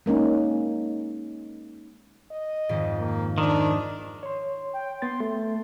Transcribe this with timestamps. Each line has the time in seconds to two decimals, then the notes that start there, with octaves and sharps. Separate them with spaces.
0.06 G#3 A#3 C#4 D#4
2.31 D#5
2.69 G#1 F2 G#2
2.99 A#3
3.38 D#3 D4
4.23 C#5 C6
4.73 G5
5.02 B3 C6 A6
5.20 A3